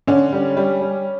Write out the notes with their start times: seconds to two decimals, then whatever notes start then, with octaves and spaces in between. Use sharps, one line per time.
0.07 D3 C#4
0.33 G3
0.57 G3
0.81 G3